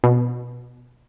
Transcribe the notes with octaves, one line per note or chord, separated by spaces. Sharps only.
B2